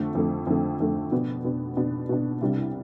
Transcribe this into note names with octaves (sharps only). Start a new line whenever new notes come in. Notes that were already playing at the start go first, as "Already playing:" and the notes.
Already playing: F2 D3 A3
F2 D3 A3
F2 D3 A3
F2 D3 A3
B2 B3 D4
B2 B3 D4
B2 B3 D4
B2 B3 D4
C2 C3 G3 D4